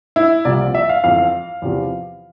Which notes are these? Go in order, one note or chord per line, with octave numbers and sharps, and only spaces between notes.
E4
C2 A#2 F3 D5
E5
F5
F2 E3 F5
F5
E2 C3 F3